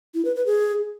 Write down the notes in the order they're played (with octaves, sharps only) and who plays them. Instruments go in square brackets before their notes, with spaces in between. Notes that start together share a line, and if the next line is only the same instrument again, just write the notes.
[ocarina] E4
B4
B4
G#4